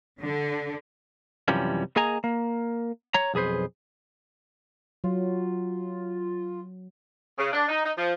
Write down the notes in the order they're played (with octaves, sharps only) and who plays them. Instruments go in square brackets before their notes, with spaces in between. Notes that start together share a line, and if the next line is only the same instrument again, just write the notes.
[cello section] D3
[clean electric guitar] F#2 C3 E3 F3 G3 C#4
A#3 G#4 D#5 G#5 A#5
A#3
C#5 A#5
B1 F2 G#4 B4 C5
[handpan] F#3 [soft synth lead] F4
[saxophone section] C#3
D4
D#4
D#4
F3